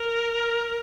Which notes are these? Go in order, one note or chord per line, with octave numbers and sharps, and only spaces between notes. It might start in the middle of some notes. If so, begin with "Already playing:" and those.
Already playing: A#4